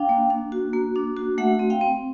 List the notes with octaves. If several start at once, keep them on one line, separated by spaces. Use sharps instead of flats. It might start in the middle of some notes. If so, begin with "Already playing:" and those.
Already playing: D4 F5 G5
A#3
D4
F#4
A#3
D4
F#4
A3 E5 F#5
C4
F5 G5
C4